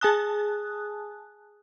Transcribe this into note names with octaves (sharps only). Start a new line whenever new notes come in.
G#4 G#5 A5 D#6 F#6